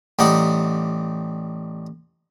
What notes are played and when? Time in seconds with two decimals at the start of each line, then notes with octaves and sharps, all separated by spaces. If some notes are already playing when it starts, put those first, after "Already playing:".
0.19 A1 G3 D#4 F#5